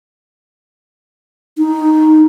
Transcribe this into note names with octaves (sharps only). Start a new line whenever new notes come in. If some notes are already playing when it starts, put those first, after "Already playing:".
D#4